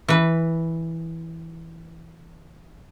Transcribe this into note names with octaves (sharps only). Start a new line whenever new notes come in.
E3 B4